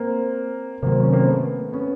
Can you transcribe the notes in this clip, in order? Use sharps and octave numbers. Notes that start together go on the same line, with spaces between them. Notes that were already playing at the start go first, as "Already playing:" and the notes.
Already playing: A#3 C4
C3 D#3 F#3 A#3 C4
C#4
A#3 C4
A3 B3
B3 C#4